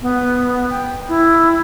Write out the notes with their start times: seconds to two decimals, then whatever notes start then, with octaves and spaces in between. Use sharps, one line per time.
0.02 B3
0.70 G5
1.09 E4